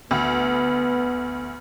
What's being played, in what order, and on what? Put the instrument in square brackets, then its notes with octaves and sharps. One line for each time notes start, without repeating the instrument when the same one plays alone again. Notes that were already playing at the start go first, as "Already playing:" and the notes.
[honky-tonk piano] D2 [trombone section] B3